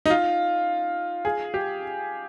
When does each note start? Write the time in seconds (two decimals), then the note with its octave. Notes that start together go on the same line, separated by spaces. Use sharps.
0.05 D#4
0.10 F4
1.25 G#4
1.54 G4